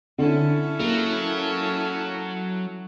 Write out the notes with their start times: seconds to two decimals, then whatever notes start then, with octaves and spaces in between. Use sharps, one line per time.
0.19 D3 C#4 E4 A4
0.80 F#3 A#3